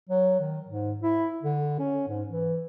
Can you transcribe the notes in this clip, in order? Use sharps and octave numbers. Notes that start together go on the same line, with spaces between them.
F#3
D#3
G#2
E4
D3
C#4
G#2
E3